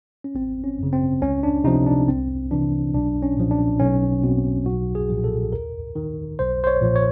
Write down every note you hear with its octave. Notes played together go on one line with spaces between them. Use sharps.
C#4
G#1 C4
C#4
F#2 C#3
C4
C#2 C#4
D4
C3 F3 D#4
D4
C2 C4
C3 E3 D4
B1 D4
C#4
A#2 F3
D4
B1 C#4
B2 C4
B1 F#4
G#4
A#2 F3
A4
D#2 A#4
D#3
B1 C5
C5
C#5
A#2 F3
C#5